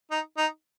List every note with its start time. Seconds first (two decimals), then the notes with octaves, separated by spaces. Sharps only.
0.11 D#4
0.38 D#4